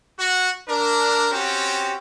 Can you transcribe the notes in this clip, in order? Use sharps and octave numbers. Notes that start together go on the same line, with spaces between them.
F#4
D4 A#4
C4 C#4 F#4 G4